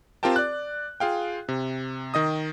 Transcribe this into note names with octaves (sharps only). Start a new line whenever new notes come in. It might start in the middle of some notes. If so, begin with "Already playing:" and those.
C4 F4 G4 A#4 G5 A5
D5 F#6
F4 G#4 F5 G5
C3
D#3 D#5 D#6